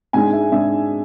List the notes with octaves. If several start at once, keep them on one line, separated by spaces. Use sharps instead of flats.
G#2 G#3 D4 G#5
E5
G#2 G#3 D4 E5